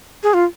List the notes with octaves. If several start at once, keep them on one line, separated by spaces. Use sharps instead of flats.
G#4
F4